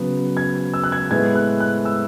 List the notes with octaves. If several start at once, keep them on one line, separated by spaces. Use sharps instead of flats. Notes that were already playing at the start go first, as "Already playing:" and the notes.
Already playing: C#3 F#3 B3
G#6
E6
F#6
G#6
A2 G#3 B3 G#6
F#6
F#6
E6